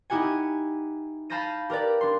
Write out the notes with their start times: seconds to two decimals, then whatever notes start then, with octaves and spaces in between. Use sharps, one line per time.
0.10 D#4 E4 G4 F#5 G#5
1.30 F5 A5 B5 G6 A#6 D#7
1.70 G4 A#4 B4 D5
2.01 D4 C6